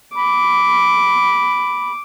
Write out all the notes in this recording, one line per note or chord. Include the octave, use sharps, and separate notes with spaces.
B5 D6